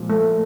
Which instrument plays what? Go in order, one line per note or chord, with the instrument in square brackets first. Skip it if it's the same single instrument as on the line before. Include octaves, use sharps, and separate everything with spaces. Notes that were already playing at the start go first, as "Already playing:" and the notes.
Already playing: [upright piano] A#2 F3 G#3
[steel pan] A3